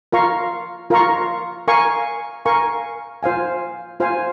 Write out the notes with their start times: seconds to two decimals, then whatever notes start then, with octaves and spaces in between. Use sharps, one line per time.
0.12 F4 A#4 F5 A#5 C#6
0.90 F4 A#4 F5 A#5 C#6
1.68 A#4 F5 G#5 C#6
2.45 A#4 F5 G#5 C#6
3.23 F4 C5 F5 G#5
4.00 F4 C5 F5 G#5